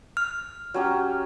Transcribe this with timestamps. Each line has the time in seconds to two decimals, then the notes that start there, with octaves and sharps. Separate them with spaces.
0.17 F6
0.74 F#3 C#4 G4